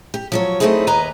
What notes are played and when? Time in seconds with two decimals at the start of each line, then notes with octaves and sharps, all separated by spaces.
0.14 G4
0.32 F3 F#3 C#5
0.60 F#3 A3 C4 D#4 E4 G#4
0.87 D#2 B4 D#5 G#5 A#5